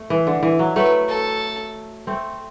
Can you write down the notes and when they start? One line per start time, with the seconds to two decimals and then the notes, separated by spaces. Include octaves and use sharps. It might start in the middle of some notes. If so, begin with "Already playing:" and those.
Already playing: A3
0.10 E3
0.27 D3
0.43 E3
0.59 F#3
0.76 F#3 A3 B4
1.09 A4
2.07 A3 C4